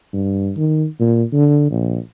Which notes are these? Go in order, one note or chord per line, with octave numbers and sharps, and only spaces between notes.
G2
D#3
A#2
D3
A#1